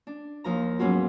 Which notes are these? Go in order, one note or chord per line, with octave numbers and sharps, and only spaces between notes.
D4
D#2 F3 A#5
G#2 F#3 B3 C#4 F4 F#4